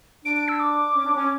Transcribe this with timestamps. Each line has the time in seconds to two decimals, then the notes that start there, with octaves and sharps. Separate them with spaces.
0.24 D4 D7
0.36 D7
0.48 E6
0.60 D6
0.95 C#4
1.06 D4
1.16 C#4